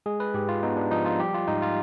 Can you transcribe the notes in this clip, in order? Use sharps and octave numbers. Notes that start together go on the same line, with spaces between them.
G#3 G#4
B4
G#2 G4
F4
B3 D#4
D4
F3 D#4
F4
G3 G4
F4
G#2 D#4
F4